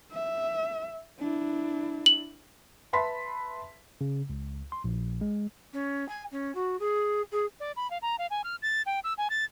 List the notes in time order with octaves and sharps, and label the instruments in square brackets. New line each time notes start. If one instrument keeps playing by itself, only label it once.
[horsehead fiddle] E5
D4 E4
[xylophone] F#7
[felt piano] B4 E5 A5 B5 C6 B6
[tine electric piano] C#3
C#2
C6
A#1
G#3
[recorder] C#4
G#5
C#4
F#4
G#4
G#4
D5
B5
F5
A#5
F5
G#5
F6
A6
G5
E6
G#5
A6